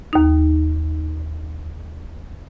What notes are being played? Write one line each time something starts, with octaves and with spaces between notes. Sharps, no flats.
D#2 D#4